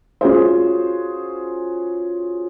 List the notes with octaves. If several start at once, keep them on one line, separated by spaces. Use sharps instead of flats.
C#4 F4 F#4 G#4 C5